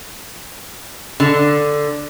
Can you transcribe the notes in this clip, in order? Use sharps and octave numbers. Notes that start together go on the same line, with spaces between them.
D3